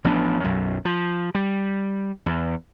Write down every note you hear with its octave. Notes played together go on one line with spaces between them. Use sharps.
A1 F3 B3 D4
B1 F#2
F3
G3
E2